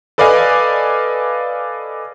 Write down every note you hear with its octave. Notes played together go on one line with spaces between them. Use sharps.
A4 B4 D5 D#5 F5 G#5